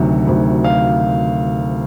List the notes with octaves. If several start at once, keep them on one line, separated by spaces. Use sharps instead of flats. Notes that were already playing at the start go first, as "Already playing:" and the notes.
Already playing: D2 C3 D#3 F#3
D2 C3 D#3 F#3
F5